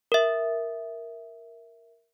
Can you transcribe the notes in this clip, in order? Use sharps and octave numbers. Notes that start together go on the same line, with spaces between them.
A#4 E5